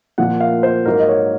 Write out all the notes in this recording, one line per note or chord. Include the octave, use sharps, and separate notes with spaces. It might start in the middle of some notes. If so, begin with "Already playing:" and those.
A#2 F3 A#3 F#5
F5
C5
G#2 F#3 A#3 A#4
D#5
C#5